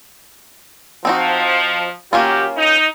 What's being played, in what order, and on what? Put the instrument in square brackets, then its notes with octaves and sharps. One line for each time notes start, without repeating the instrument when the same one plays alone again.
[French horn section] F3 [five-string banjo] C4 D#4 F#4
[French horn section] D#3 F#3 G4 [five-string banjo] A#3 C#4 F4
[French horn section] D#4